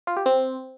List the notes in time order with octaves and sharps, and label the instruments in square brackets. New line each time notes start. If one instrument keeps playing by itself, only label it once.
[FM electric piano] F4
G4
C4